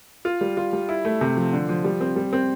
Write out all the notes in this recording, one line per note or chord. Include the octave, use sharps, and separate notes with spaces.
F4
G3
F4
G3
E4
A3
C3
F3
D3
F3
G3
C4
G3
C4